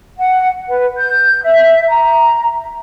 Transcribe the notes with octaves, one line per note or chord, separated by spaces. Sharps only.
F#5
B4
G6
E5
A#5